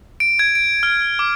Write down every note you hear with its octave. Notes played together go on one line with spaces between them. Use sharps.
D7
G#6
D7
F6
D6